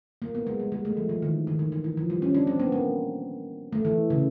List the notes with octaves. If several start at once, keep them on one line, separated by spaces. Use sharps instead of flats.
A#3
B3
G#3
G3
G#3
A3
F3
E3
D#3
D#3
E3
E3
E3
F3
G3
C#4
D4
C4
B3
A#3
A3
E3
C#3